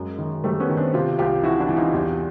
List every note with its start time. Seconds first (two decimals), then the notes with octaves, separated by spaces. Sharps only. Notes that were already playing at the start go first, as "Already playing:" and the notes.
Already playing: F#2 G#3 A#3
0.18 D#3
0.44 D#3 G3 A3
0.60 B3 C#4
0.69 D#3
0.77 C4 D4
0.94 C3 F4 G4
1.19 C2 F4 G4
1.43 E3 E4 F#4
1.60 D4 E4
1.69 E3
1.77 D#4 F4
1.93 E2 F4 G4